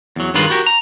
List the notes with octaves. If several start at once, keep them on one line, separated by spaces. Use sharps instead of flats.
E2 F#3
G2 D#3 G#3 F4 B4
F#4 G4 A#4
A#5